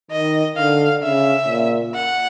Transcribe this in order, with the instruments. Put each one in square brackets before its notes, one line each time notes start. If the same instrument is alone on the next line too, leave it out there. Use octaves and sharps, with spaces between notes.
[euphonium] D#3 [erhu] D#5
[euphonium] D3 [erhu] F5
[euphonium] C#3 [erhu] E5
[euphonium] A#2
[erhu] F#5